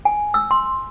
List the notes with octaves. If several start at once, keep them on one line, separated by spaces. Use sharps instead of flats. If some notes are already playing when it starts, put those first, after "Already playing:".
G#5
E6
C6